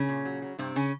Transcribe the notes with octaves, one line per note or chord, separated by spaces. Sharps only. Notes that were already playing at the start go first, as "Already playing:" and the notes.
Already playing: C#3 C#4
A#2
F#3
F#3
G2 C3 C4
C#3 C#4